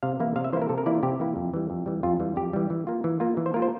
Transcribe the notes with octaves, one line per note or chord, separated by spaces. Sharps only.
C3 F5
E3 A#3 E4
C3 F5
E5
E3 A#3 E4 C5
A#4
C3 A4
A#4
E3 A#3 E4 D5
F4
C3 G4
E3 A#3 E4
F2
E3 G3
F2
E3 G3
F2 F4
E3 G3
F2 G4
E3 G3
E3
A#3 F4
E3
A#3 F4
E3
C5
A#3 F4 A#4
C5